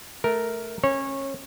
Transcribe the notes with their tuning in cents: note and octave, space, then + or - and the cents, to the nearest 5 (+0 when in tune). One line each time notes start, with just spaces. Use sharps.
A3 -10 A#4 +0
C#4 -25 C#5 -20